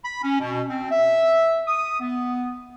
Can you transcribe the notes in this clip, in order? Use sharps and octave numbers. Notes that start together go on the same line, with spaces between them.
B5
C#4
B2
C4
E5
D#6
B3